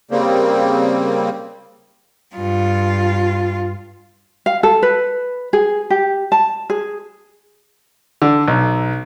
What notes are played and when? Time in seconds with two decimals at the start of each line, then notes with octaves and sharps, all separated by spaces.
0.11 C#3 G3 A#3 C4
2.35 G2 F4
4.46 F5
4.63 A4
4.83 B4
5.53 G#4
5.90 G4
6.32 A5
6.70 G#4
8.22 D3
8.48 B1